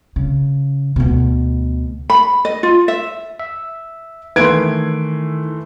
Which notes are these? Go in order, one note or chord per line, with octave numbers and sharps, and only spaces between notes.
C#3
D2 B2
B5
D#5
F4
E5
E5
D#3 E3 A3 B4 C6 G#6 D7